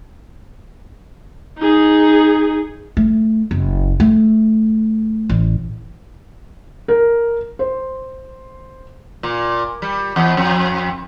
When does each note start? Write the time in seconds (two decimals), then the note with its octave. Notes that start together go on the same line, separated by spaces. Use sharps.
1.59 D#4 G#4
2.97 A3
3.51 F#1
4.00 A3
5.29 A1
6.88 A#4
7.59 C5
9.23 A#2
9.82 G3
10.16 E2
10.37 F2